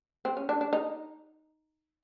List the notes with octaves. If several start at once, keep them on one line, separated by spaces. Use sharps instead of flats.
C4
C#4
D4
D4
D#4